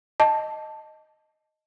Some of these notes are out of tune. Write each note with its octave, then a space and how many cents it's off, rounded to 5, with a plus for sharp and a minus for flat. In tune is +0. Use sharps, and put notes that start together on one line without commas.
D#5 +0 A5 +0